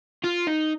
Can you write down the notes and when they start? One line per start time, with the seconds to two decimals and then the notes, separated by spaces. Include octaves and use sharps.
0.24 F4
0.48 D#4